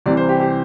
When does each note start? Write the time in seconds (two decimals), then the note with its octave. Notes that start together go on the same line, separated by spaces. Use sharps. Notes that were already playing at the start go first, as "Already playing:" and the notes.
0.06 C2 C3 E3 D5
0.17 C5
0.29 G4
0.40 G4